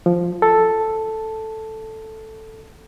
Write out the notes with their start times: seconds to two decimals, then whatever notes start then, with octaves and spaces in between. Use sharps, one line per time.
0.06 F3
0.42 A4